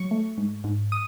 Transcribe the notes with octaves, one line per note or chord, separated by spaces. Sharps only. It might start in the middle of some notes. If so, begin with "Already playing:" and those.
Already playing: F#3 C#6
A3
G#2
G#2
D#6